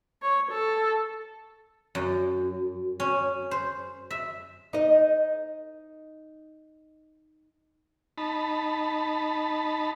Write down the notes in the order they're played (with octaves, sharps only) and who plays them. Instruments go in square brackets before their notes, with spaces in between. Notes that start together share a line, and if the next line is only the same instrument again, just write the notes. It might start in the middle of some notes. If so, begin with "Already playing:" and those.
[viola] C#5
A4
[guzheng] F#2
C#4
C5
E5
[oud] D#4 D#5
[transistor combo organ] D#4 A5 B5